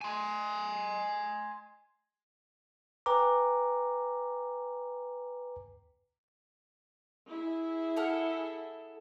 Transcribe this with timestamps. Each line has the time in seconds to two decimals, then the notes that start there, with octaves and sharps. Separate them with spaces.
0.01 G#5 C6
3.06 B4 G5 G#5 A#5 D6
7.27 E4 G#4
7.96 A4 F#5 F6